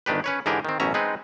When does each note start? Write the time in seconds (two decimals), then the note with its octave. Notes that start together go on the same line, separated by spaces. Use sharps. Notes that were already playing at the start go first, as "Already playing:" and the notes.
0.06 G1 D#3 D4 G4 B4
0.24 C#4 B4 C#5
0.46 G#2 D3 E3 G4 G#4 A#4
0.65 D#3 C4
0.80 A1 F#2 B2 C#4 E5 A#5
0.94 G#3 C4 D#4 B4